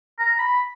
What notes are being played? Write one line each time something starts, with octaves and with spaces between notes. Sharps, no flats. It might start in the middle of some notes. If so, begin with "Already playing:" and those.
A#5
B5